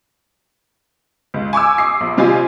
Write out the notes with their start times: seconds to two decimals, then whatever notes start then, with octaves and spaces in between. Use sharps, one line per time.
1.34 C#2
1.53 G#5 C#6 D6 E6
1.78 D6 D#6 C7
2.01 A#1
2.17 C3 G3 F4 D#5 G#5